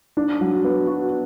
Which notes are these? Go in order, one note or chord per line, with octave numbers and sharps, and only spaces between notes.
D4
F#3
B3
F#4